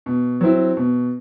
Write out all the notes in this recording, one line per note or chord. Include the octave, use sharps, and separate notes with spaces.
B2
F#3 C4 E4
B2